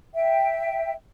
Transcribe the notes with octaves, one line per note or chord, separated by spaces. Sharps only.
E5 G5